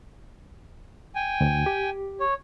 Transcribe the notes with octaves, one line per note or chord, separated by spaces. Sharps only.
G5 G#5
D2
G4
C#5